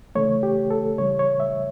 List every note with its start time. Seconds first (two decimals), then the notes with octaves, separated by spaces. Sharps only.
0.15 C#3 E3 A3 C#5
0.43 G4
0.70 A4
0.98 C#3 E3 G3 C#5
1.19 C#5
1.40 E5